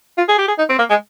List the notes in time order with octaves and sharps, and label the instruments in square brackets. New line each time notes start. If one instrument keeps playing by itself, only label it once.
[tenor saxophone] F4
G#4
G4
G#4
D#4
C4
A#3
G#3